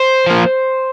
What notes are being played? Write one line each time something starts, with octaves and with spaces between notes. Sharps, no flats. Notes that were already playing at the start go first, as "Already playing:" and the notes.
Already playing: C5
F3 A#3